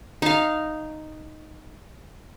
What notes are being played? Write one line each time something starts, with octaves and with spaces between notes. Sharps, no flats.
D#4 F5